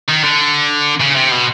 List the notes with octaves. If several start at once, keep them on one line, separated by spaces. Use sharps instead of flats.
D#3
D3
C#3
C3
B2